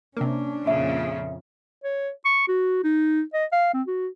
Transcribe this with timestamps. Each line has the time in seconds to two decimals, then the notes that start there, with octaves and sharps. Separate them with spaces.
0.17 C3 A#3 C#4 D4
0.67 F2 A#2 C#3 E5
1.84 C#5
2.25 C#6
2.48 F#4
2.84 D#4
3.34 D#5
3.52 F5
3.74 C4
3.87 F#4